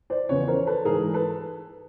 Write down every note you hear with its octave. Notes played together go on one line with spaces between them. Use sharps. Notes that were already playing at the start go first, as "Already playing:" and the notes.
C5 D5
E2 C#3 F3 B4 C#5
A#4 C5
A4 B4
G#2 E3 G#4 A#4
A4 B4